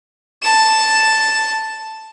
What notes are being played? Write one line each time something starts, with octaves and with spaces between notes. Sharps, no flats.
A5 E7